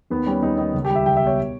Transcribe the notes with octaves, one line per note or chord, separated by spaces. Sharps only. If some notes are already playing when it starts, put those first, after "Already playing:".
D#2 B3
G3 C#4
D#2 D#4
D#3 D#4
C#2
G4
G3
E5
C#2 G5
E5
B2 C#5